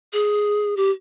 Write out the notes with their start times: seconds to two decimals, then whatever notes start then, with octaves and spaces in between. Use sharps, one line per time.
0.13 G#4
0.77 G4